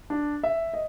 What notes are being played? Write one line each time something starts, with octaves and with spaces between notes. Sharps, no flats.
D4
E5
D#5